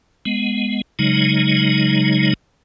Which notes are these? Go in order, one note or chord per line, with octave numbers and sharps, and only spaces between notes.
G#3 B3
C#3 F#3 G#3 D#4